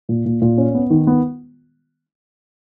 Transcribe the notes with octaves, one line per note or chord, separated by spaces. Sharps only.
A#2
A#2
A#2
C#4
B3
D#3
B3